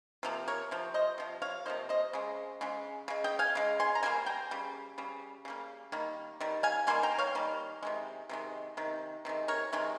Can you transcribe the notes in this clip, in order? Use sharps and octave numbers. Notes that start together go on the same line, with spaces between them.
C3 F3 A#3
A#4 C#5
C3 F3
C5 D#5
C3 F3
C#5 F5
C3 F3 A#3 C5 D#5
C5 D#5
C#3 G#3
C#3 G#3
C#3 G#3
D#5 G5
F5 G#5
C#3 G#3
G#5 C6
A#5
C#3 G3 A#3 G#5 C6
G5 A#5
C#3 G3
C#3 G3
C#3 G3 A#3
D#3 G3 A#3
D#3 G3
F5 G#5
D#3 G3 A#3 G#5 C6
G5 A#5
C#5 F5
D#3 G3 A#3
C3 D#3 G#3
C3 D#3 G#3
C3 D#3
C3 D#3 G#3
A#4 C#5
C3 D#3 G#3